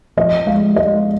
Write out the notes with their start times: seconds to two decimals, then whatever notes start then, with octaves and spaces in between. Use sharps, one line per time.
0.17 F3 D#5
0.46 G#3 F5
0.76 G#3 D#5